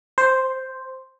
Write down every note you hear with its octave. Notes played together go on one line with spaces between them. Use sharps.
C5